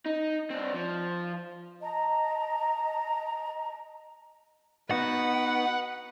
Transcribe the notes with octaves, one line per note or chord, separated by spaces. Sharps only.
D#4
C4 D4
F3
D#5 A5 A#5
B3 D#4 F#4 B4 F#5